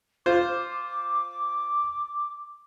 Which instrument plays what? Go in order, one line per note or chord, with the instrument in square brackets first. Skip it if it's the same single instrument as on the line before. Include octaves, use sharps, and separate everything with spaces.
[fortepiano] F4 C5 [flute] D6